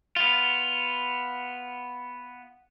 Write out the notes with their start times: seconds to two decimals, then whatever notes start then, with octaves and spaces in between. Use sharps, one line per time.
0.16 B3 F4